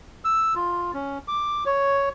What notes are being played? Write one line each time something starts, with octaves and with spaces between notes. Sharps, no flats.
E6
F4
C#4
D6
C#5